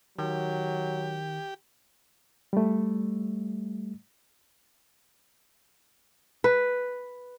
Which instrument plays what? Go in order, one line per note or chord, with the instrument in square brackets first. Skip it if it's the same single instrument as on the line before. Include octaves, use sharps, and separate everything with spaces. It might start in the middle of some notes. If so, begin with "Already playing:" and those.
[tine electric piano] D#3 [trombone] F#3 [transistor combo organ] G4
[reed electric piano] G3 A3
[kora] B4